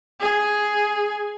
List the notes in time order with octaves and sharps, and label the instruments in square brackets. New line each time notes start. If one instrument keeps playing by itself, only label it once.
[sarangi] G#4